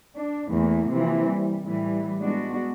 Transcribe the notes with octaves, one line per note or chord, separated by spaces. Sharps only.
D4
E2 E3 A3 A#3
C3 E3 F3 A#3 C4
G3
A2 E3 G3
G#3 B3 D4 F#4